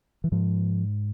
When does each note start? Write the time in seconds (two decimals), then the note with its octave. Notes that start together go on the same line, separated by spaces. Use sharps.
0.24 E3
0.32 G#2 F3